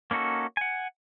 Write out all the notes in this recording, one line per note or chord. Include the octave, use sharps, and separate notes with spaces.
A#3 C#4 D#4 F#4 A4
F#5 G#5